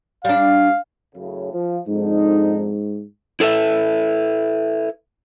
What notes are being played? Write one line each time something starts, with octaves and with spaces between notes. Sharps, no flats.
G3 D4 F5
F#2 A2 C#3
F3
F2 G#2 D3 D#4
E4 A4 B4 E5